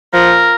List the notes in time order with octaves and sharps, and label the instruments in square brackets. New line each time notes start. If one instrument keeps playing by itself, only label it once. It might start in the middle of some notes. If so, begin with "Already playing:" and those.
[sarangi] F3 [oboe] A#4